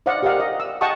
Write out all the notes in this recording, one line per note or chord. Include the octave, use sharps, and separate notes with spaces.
C5 D5 D#5 F5 F#5
G4 A#4 D5 D#5 F5 F#5
D#5
E6
D#5 F#5 G5 A5 C#6 D#6